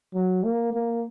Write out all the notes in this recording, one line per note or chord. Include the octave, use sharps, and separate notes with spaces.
F#3
A#3
A#3